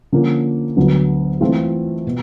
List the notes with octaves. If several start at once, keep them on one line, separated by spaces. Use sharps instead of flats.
D3 F3 A#3 C#4
D2 D3 F#3 B3
E3 A3 C4 F4
B2